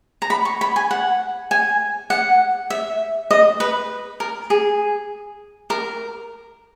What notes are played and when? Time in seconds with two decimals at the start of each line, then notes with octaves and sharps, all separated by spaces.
0.22 A#5
0.30 B5
0.45 C#6
0.61 B5
0.76 G#5
0.91 F#5
1.51 G#5
2.10 F#5
2.70 E5
3.31 D#5
3.60 B4
4.20 A#4
4.50 G#4
5.70 A#4